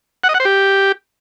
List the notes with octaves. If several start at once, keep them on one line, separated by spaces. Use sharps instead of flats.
F#5
D#5
F#5
C5
G4